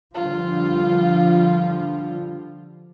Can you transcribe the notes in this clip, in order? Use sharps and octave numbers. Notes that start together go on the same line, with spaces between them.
D3 F3 G3 F4